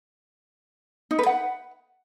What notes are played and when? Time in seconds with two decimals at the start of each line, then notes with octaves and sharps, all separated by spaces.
1.11 D#4
1.19 B4
1.26 F#5